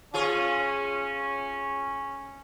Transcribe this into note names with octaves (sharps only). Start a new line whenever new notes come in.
C#4 F4 G#4 C#5